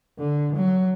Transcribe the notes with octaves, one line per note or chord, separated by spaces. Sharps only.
D3
F#3